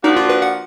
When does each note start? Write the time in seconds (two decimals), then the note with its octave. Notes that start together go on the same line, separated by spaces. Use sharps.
0.04 F3 A#3 D4 D#4 F#4
0.17 F4
0.29 B4
0.42 F#5